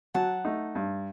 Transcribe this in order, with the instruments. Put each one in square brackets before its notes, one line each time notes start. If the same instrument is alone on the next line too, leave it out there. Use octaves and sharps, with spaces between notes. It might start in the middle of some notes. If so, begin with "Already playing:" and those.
[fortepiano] F#3 [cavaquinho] F#5 A5
[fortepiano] A3 D#4
G2